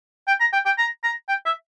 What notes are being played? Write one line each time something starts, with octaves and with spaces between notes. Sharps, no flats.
G5
A#5
G5
G5
A#5
A#5
G5
E5